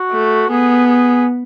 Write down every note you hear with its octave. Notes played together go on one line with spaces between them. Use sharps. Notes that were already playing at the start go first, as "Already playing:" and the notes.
Already playing: F#4
A3
B3 G#4
G#4